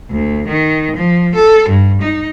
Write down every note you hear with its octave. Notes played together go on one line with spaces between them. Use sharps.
D2
D#3
F3
A4
G2
D#4